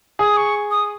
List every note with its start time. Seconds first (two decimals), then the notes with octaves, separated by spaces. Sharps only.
0.19 G#4 D#6
0.37 C#6
0.71 D#6